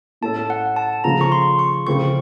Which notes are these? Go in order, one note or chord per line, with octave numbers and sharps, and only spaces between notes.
A2 A3 C#4 A4 A5
F#5
A5
C#3 F3 A3 A#5
C#6
C6
C#6
C#3 F3 A3 C4 C#6